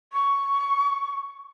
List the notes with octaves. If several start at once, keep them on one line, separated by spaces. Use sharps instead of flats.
C#6